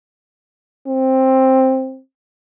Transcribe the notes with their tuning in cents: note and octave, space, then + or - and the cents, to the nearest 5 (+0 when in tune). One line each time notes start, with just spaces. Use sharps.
C4 +10